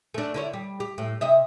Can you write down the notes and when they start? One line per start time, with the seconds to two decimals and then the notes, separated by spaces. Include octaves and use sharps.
0.14 A3 D4
0.34 D3 E4 C#5
0.53 G3
0.80 G4
0.98 A2
1.21 C3 D#5 E5